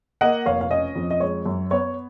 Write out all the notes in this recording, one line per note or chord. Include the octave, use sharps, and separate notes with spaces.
A#3 D#5 F#5
F1 C#5 F5
F5
C#4 D#5
F2
D#5
G#3 C#5
F#2
B3 C#5